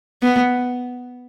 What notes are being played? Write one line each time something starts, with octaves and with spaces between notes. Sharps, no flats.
B3